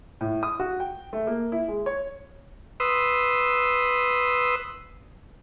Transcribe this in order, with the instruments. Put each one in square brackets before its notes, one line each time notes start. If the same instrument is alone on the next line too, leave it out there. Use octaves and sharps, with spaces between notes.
[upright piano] A2
D#6
F#4
G5
A3
A#3
E4
G#3
C#5
[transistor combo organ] B4 C6 D#6 E6